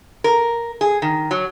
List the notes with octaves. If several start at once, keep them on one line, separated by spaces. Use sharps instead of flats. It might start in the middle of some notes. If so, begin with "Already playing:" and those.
A#4
G#4
D#3
F#3